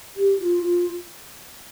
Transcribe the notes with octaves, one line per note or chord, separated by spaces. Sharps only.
G4
F4
F4